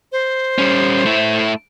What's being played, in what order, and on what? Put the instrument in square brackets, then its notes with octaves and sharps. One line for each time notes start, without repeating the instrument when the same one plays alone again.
[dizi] C5
[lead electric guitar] G3 C#4
A3 E4